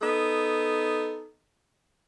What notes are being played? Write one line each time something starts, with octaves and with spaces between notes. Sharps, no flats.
B3 D#4 A4